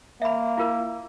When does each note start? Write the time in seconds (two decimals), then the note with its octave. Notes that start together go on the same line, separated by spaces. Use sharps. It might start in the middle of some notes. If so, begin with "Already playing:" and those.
0.22 A#3 E5 B5
0.57 E4 F4 A#4